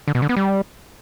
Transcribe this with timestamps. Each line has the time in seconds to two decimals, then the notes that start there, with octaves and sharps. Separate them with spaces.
0.08 D3
0.15 B2
0.22 D3
0.29 B3
0.37 G3